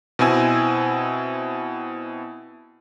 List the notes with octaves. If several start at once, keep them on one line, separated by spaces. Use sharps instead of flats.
B2 C4 E4 G#5 E6